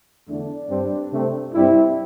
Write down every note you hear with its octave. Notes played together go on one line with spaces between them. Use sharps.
E2 D3 A3 D4
G2 G3 C4
C3 A3 C4
G2 G3 C4 E4